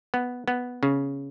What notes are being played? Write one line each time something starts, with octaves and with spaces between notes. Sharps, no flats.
B3
B3
C#3